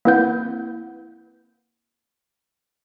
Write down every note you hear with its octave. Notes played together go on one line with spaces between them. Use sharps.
A#3 C4 E4 B4 F#5 G6